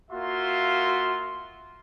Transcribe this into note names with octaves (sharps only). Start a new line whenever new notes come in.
A#3 F4 F#4 E5 C6